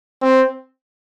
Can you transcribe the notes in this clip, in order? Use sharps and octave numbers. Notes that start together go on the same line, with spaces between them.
C4